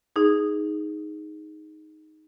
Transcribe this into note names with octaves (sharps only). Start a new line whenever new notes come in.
D#4 G#4